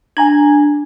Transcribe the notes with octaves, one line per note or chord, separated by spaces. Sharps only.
D4 G#5 A#5 G#6